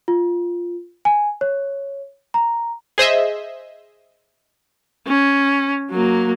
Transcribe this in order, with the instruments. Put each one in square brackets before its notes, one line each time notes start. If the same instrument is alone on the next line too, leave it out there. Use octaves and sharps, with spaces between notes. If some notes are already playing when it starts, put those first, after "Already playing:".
[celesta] F4
G#5
C#5
A#5
[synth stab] G#4 C5 D#5 E5
[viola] C#4
F#3 A#3